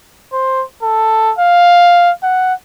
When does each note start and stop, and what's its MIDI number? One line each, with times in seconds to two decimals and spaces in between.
0.33 0.63 72
0.83 1.32 69
1.39 2.11 77
2.23 2.54 78